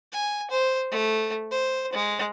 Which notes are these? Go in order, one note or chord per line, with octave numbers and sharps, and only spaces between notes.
G#5
C5
A3
C5
G#3